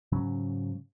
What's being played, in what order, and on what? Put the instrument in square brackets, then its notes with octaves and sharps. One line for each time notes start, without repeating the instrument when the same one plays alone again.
[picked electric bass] G#2 C#3 F#3 C#4